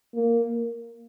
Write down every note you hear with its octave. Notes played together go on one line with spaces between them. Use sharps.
A#3